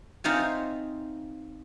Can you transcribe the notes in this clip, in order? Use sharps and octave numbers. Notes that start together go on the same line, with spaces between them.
C4 D#4 F4 C#5 E5 G#5